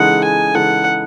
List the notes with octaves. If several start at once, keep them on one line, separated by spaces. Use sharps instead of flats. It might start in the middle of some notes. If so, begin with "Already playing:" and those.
Already playing: C#3 E3 G#3 D#4 A4 F#5
G#5
C#3 E3 G#3 D#4 A4 F#5